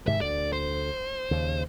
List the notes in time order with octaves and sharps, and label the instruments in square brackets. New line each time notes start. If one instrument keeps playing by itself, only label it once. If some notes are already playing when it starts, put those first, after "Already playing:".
[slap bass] G#2 C3 D#3 [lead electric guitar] E5
[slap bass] D2 D3 [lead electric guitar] D5
[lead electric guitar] C5
[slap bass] D#2 C#3